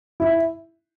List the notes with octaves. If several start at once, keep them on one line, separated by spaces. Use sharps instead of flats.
E4